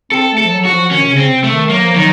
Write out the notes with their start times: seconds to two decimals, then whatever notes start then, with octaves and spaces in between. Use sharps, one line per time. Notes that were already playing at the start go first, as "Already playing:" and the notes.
0.12 C4 A4
0.32 A3
0.38 A4
0.45 F3
0.52 F#3
0.65 F#4
0.71 F3
0.91 D#3 C#4
1.01 C3
1.11 C#3
1.18 C4
1.30 C3
1.44 A3
1.50 D#3
1.69 F#3 A#3
1.83 F3
1.96 D#3 F#3